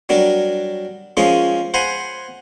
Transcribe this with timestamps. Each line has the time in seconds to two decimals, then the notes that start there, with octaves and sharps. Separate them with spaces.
0.09 F#3 G3 D4 A#4
1.17 F3 G#3 C#4 G#4 A#4
1.74 C5 F#5 G#5 A#5 B5